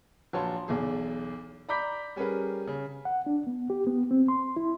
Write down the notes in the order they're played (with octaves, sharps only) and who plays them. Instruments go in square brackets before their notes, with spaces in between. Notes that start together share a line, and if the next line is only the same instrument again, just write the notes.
[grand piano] A#1 F#3 B4 C#5 A5 C6
B1 E2 G#4
D5 A#5 B5 D6 G6 B6
G3 C#4 G#4 A#4 B4
C#3
[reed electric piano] F#5
D4
B3
G4
B3
C4
C6
E4